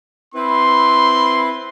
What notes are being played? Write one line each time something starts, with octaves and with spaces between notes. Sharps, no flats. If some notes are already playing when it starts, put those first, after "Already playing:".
C4 E4 B4 C6